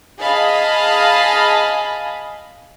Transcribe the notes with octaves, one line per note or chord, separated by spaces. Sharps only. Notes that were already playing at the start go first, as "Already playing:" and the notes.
G#4 D#5 F5 A5 B5